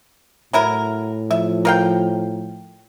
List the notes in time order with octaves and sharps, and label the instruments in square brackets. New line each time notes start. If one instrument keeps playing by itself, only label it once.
[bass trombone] A2 [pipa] F#3 E4 A#4
[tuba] F3 [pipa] E5
[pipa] A#4 F5 G5